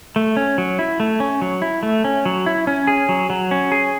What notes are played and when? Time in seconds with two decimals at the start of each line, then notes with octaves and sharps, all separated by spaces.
0.16 A3
0.37 C#4
0.58 F#3
0.79 E4
1.00 A3
1.20 C#4
1.42 F#3
1.62 E4
1.83 A3
2.04 C#4
2.26 F#3
2.46 E4
2.67 C#4
2.87 G#4
3.09 F#3
3.30 F#3
3.51 C#4
3.72 G#4